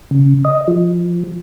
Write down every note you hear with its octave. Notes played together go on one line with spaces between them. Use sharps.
C#3
D#5
F3